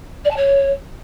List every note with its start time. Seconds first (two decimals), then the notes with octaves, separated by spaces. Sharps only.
0.24 D5
0.30 A5
0.36 C#5